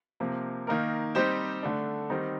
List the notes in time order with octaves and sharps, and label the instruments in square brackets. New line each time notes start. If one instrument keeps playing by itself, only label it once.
[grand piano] C3 F3 A#3
D#3 A#3 D#4 A#4
G3 C4 D#4 G4 C5
D3 A3 D4
D#3 G3 C4 D#4